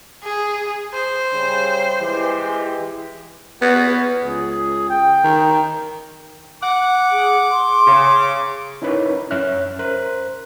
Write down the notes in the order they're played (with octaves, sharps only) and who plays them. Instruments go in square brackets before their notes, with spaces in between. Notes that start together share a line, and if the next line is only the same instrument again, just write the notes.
[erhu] G#4
C5
[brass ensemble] C#3 G3
E3 G#3 G4
[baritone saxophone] B3 [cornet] F#4
[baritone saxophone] C#2 [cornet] G#4
[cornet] G5
[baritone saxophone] D#3
[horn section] F#5 [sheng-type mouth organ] D6
[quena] G#4
C6
[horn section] C#3
[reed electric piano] C#4 D#4 E4 A#4 B4 C#5
F#2 C#4 C#5 E5 F6 F#6
A#4 C5 F#6